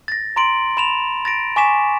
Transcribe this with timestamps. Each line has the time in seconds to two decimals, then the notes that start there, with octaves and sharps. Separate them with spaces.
0.08 A6 A#6
0.36 A#5 C6 D7 F#7
0.77 B5 E7 F7
1.25 A6 A#6 D7
1.56 G#5 C#6 D6 B6 E7